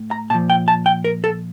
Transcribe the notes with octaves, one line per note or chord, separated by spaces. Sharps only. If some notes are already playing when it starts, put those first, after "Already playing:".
Already playing: A2
A#5
A#2 F3 A5
G5
A5
G5
A#4
A4